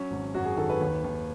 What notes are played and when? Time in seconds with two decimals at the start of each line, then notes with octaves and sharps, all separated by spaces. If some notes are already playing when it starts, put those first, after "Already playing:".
Already playing: F#3 C#4
0.11 G#1
0.34 F#2 F#4
0.45 G#4
0.57 D#3 A4
0.69 B4
0.80 D#2
1.04 D#2